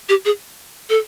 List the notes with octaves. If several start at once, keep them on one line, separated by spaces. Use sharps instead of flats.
G4
G#4
A4